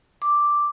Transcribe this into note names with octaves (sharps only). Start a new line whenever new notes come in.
D6